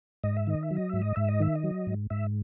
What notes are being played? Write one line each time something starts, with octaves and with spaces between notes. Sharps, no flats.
G#2 D#5
E5
D#3 D#5
E5
F#3
D#5
G#2 E5
D#5
G#2 E5
D#5
D#3 E5
D#5
F#3
G#2
G#2 E5